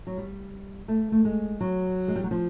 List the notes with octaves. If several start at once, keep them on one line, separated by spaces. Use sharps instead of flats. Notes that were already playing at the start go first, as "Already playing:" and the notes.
F#3
G3
A3
A3
G#3
F#3
G#3
G3
F#3
F3